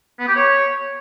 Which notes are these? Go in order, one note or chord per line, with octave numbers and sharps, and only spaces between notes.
B3
G4
C#5